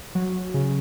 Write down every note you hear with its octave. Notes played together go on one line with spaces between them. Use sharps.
F#3
C#3